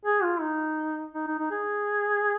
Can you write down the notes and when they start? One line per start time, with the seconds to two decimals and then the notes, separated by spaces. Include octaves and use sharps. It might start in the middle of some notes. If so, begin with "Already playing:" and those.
0.06 G#4
0.23 F4
0.41 D#4
1.14 D#4
1.27 D#4
1.39 D#4
1.51 G#4